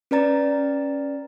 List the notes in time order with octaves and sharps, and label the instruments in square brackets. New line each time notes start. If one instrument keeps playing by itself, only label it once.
[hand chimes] C#4 B4 D5 A#5 A6